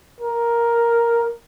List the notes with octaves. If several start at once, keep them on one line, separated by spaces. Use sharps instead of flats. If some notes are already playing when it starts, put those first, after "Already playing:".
A#4